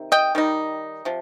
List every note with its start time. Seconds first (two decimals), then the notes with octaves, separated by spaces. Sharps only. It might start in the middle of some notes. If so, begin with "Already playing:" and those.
Already playing: C3 D#3
0.12 D#5 G5
0.35 D#3 G3 D#4
1.05 C3 F3